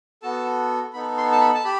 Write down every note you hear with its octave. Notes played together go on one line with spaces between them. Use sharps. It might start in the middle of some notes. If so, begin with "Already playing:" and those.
B3 F#4 A4 A5
B3 D#4 A4 B5
C6
A5
B5
A5
G4 B5